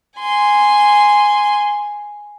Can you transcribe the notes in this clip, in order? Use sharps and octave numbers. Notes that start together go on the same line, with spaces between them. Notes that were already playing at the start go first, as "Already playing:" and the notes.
G#5 C6